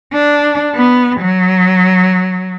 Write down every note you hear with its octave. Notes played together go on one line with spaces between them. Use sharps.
D4
B3
F#3